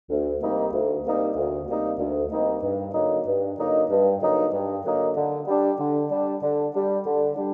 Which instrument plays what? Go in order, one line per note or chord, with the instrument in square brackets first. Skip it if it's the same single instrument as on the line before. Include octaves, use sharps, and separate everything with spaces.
[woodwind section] D2
C3 G3 A#3 D#4
D2
C3 G3 A#3 D#4
D2
C3 G3 A#3 D#4
D2
C3 G3 A#3 D#4
G2
D3 F#3 A#3 D#4
G2
D3 F#3 A#3 D#4
G2
D3 F#3 A#3 D#4
G2
D3 F#3 A#3 D#4
D3
G3 D4
D3
G3 D4
D3
G3 D4
D3
G3 D4